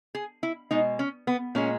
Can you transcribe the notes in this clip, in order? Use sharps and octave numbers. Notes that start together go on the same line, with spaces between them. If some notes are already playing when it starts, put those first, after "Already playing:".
G#4
E4
B2 G#3 D#4
C#4
B3
A#2 G#3 C#4